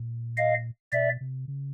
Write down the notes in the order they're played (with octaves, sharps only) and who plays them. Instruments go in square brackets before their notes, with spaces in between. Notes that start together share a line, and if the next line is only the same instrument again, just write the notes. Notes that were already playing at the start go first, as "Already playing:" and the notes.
Already playing: [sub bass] A#2
[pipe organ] D#5 F5
[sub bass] B2 [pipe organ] D5 E5
[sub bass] C3
C#3